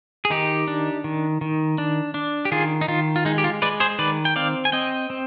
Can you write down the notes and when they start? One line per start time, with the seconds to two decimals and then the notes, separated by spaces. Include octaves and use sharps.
0.25 G#4
0.30 D#3 D#4 G4
0.68 D4
1.04 D#3
1.41 D#3
1.78 D4
2.14 D4
2.45 G4
2.52 D#3 F4 G#4
2.81 D#4
2.88 D#3 F4
3.16 F4
3.25 G#3 D#4
3.38 G4
3.44 F4
3.62 G#3 B4 D5
3.80 G#4 C5
3.99 D#3 B4 D5
4.25 G5
4.36 C4 D5 F5
4.65 G#5
4.72 C4 D#5 G5
5.10 C4